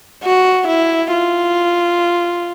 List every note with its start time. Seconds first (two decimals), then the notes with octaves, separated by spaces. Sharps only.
0.23 F#4
0.68 E4
1.12 F4